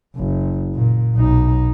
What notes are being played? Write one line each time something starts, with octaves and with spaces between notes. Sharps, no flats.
F#1
A#2
B1 D#4